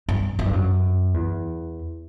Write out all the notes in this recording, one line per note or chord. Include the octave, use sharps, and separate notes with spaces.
G2
F#2
G2
F#2
E2